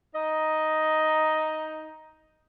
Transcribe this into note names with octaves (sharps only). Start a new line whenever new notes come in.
D#4 D#5